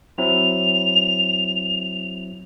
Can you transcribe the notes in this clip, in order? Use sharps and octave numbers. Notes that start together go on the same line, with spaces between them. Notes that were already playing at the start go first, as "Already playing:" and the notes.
F#3 C4 E4 F7